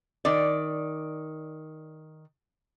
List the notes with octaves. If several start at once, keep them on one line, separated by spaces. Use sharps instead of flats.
D#3 D5